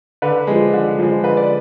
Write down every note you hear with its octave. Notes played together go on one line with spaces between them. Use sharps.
D3 B4
F3 G#3
D3
F3 G#3
D3 B4
D5